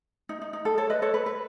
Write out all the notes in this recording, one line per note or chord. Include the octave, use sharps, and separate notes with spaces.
D#4
D#4
D#4
A4
A4 C#5
B4 D#5
A4 C#5
B4
B4